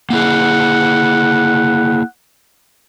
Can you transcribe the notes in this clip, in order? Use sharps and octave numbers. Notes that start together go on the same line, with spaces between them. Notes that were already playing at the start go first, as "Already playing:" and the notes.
A#3 E4 G#4 F#5